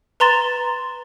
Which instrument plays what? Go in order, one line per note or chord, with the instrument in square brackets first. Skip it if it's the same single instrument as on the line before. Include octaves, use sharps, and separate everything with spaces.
[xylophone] B4 A#5 C6 A6 E7